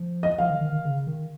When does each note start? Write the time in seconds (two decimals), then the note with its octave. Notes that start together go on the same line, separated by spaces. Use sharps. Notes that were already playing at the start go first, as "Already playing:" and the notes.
Already playing: F3
0.23 D#5
0.38 F3 F5
0.50 D#3
0.61 D#3
0.72 D#3
0.85 C#3
1.07 D#3